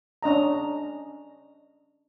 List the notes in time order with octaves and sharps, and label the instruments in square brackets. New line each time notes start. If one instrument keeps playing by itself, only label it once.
[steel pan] C#4 D4 D#5 A#5